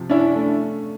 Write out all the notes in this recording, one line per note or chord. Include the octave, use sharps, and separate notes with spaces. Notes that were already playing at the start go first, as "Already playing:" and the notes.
Already playing: C3 F3
C#4 D4 E4
A3